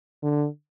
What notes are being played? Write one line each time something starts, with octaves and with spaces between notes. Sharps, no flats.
D3